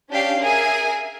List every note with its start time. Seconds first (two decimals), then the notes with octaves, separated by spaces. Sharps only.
0.11 C#4 D4 G4 F5
0.40 G#4 A#4 E5 G#5